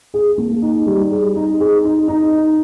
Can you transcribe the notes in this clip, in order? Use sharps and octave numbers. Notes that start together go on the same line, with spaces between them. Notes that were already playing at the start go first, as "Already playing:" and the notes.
G#4
A#3
D#4
G3
G#4
D#4
G#4
D#4
D#4
D#4